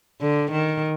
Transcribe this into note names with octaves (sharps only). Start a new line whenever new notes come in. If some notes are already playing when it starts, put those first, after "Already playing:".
D3
D#3